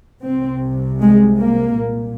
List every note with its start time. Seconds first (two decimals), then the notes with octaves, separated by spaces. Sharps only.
0.24 C2 C3 C4
1.01 G#3
1.41 A#3
1.79 C2 A#2